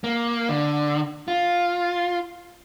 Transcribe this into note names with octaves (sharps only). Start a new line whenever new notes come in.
A#3
D3
F4